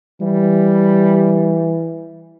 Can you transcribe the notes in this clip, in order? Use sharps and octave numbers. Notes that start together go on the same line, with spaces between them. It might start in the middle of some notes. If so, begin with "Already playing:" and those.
E3 G3